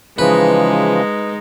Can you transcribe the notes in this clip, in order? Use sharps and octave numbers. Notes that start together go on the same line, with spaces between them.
C#3 E3 F3 G#3 D#4 B4